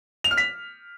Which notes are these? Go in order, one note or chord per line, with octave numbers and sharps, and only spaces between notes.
F7
F6
B6